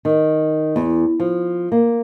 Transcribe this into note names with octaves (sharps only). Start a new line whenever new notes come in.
D#3
E2
F3
A#3